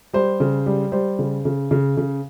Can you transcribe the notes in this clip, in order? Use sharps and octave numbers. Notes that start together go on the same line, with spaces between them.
G3 C5
C#3
G3
G3 C5
C#3
C#3
C#3
C#3